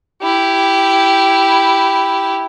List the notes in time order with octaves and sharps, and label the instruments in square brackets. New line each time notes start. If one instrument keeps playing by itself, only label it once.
[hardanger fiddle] E4 G4